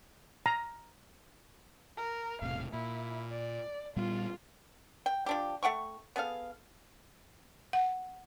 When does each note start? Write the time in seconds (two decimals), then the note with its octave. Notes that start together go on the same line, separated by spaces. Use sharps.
0.46 A#5
1.97 A#4
2.42 E1 A2 C3 F5
2.73 A#2 E4
3.30 D5
3.96 A#2 G3 B3 F4
5.06 G5
5.26 F3 D4 G4
5.63 A3 F#5 G5 C#6
6.16 B3 G#4 A4 F5
7.73 F#5